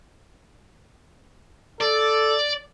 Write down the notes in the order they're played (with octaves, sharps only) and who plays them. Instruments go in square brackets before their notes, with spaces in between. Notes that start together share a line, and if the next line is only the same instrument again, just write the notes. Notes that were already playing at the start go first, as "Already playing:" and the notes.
[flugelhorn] A4 [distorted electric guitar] D5